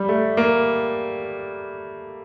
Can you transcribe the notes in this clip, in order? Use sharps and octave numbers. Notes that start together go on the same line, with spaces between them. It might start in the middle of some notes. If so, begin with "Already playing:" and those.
Already playing: G3
A3
A#3